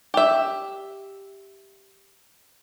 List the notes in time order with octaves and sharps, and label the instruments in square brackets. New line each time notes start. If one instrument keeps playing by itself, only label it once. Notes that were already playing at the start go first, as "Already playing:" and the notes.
[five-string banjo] G4 E5